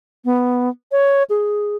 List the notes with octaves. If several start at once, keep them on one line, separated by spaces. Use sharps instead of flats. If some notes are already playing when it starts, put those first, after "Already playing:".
B3
C#5
G#4